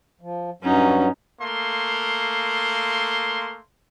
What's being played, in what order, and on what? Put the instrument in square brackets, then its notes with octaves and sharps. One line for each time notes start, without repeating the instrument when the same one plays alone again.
[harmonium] F3
[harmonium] G2 F#3 [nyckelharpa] C#4 D#4
[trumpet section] A3 A#3 C6